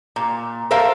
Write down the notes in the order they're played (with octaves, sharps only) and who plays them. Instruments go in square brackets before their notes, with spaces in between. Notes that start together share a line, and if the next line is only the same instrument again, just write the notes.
[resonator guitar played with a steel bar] A#2
A4 A#4 C5 E5 F5 A#5